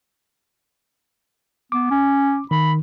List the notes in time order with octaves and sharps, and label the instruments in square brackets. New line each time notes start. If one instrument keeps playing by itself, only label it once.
[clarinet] B3 [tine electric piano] D6
[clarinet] C#4
[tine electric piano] D#3 [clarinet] B5